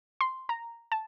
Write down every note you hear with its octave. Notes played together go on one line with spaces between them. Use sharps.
C6
A#5
A5